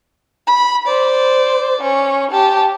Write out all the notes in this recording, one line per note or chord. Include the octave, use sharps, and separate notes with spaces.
B5
C5 D5
C#4 C#6
G4 A5